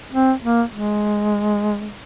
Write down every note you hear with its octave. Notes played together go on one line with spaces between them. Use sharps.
C4
A#3
G#3